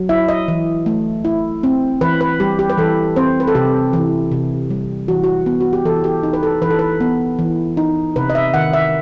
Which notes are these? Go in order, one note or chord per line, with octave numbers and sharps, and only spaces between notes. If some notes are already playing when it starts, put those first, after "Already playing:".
Already playing: F#3
E4 E5
D#5
E3
A3
E4
C4
E3 B4
B4
G3 G4
G4
B4
E3 A4
C4 C5
B4
A4
C3 G4
E3
C3
G3
E3 F#4
F#4
B3
F#4
G4
E3 A4
G4
D#4
B4
A4
E3 B4
A4
B4
B3
E3
D#4
C3 B4
D#5
E5
D#3 F#5
E5